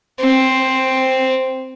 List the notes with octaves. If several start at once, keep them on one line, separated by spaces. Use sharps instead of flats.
C4